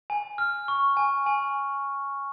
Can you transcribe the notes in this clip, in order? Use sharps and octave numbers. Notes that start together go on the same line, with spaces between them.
G#5
F6
C#6
G#5
G#5